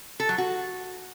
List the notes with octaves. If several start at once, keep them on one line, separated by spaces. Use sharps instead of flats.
A4
F#3
F#4